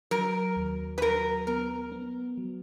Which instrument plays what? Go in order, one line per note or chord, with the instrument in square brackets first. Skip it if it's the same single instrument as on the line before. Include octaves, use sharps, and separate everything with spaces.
[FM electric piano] F#3 [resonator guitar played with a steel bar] A#4
[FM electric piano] D#2
[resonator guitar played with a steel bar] B4
[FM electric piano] F#3 [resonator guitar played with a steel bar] A#4
[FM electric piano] B3 [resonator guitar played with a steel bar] A#4
[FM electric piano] B3
F#3